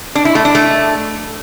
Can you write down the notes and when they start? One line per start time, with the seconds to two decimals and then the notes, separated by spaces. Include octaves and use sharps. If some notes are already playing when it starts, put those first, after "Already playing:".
0.15 D4
0.25 E4
0.35 A3
0.45 D4
0.55 A3